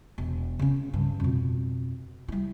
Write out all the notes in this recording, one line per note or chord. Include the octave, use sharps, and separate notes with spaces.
E1
C#3 C#4
G2
F2 B2
G3 E4